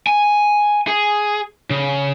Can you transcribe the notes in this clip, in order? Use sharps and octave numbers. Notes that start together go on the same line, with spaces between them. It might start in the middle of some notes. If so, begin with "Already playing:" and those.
G#5
G#4
C#3